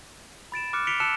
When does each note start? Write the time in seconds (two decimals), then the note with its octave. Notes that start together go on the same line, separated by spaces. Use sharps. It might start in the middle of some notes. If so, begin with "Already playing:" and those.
0.52 B5 A6 D7 E7
0.73 D6 F6 F#6 C#7
0.87 B6 C#7 D7 F7 G7
1.00 A5 E6 F#6 C#7 E7